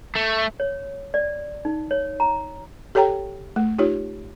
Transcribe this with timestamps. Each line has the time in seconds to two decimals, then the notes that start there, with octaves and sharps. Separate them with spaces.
0.15 A3
0.60 C#5
1.14 D5
1.65 D#4
1.91 C#5
2.20 A#5
2.95 G4 A4 C#5 G5 A#5
3.56 A3
3.79 D#4 F4 G4 C#5